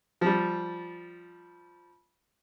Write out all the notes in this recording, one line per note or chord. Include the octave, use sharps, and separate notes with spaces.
F3 G3